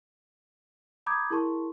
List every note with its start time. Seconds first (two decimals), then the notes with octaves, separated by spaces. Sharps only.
1.06 A#5 B5 D6 D#6 G6 G#6
1.30 E4 G#4 A#4 A5 C6 C#6